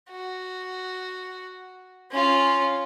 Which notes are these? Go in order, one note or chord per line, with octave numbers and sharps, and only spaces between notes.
F#4
C#4 F4